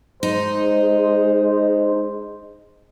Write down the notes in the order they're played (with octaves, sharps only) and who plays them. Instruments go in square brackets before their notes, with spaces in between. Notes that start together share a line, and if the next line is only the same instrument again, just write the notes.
[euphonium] G#3 [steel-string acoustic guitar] D#4 [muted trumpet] C5